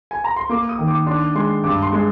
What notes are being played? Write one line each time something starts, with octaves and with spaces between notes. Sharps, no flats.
G#5
A#5
C6
A#3 D6
D#6
D#3
D6
D4 C6
G#3 C6
G2 D6
C6
G#3